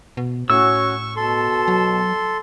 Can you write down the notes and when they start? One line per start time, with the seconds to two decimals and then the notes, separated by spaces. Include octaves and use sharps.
0.17 B2
0.50 A2 C#4 F#4 C#5 C#6 E6
1.16 B2 A4 C6
1.68 F#3